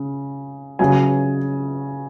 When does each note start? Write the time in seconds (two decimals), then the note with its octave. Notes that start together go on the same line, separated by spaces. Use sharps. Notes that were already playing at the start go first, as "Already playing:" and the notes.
Already playing: C#3
0.79 C#3 F#3 G#5